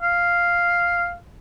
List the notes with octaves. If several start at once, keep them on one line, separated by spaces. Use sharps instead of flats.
F5